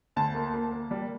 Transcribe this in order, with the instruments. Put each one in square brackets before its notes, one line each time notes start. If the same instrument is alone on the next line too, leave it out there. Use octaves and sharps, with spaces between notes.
[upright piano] D2 A5
A#3
A#3
A#3
G3